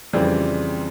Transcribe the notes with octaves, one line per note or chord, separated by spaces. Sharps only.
F2 C#3 E3 G3 C4